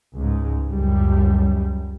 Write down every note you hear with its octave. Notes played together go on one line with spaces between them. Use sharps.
C#2 G#2
C#2 F#2 G3